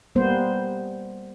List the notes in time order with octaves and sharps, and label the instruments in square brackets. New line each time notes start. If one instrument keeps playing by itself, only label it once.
[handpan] G3 A#3 B3 C5